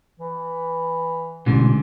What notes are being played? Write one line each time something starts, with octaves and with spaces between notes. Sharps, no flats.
E3
A1 G#2 B2 D3